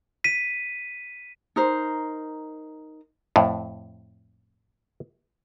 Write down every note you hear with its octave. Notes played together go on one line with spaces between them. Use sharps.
B6 D#7
D#4 A#4 C5
F2 A2